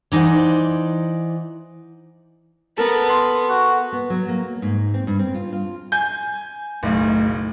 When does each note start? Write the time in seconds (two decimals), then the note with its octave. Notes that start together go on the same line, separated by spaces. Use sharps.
0.12 E3 D#4 C5 D5 F#5
2.78 B3 A4 A#4
3.09 C6
3.50 F#4
3.93 B3
4.10 F#3
4.28 A#3
4.62 G#2
4.94 C4
5.07 G2
5.19 C4
5.34 F4
5.53 F4
5.92 G#5 G6
6.83 F#1 B1 A3